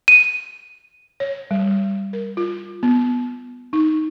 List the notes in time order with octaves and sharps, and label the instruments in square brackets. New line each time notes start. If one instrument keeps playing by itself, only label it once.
[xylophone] D#7
[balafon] C#5
G3
A#4
F4
B3
D#4